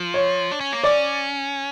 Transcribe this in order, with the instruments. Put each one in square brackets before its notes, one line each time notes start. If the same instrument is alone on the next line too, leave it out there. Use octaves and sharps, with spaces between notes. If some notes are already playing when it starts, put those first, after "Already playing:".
Already playing: [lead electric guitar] F3
[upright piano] C#5
[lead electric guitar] D4
C#4
A#3
[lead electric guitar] C#4 [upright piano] D5